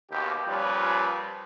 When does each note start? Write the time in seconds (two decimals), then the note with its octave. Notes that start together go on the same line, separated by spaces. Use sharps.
0.11 G#1 D#2 B2 G4
0.47 A#2 F3 G3 C#4 F4 B4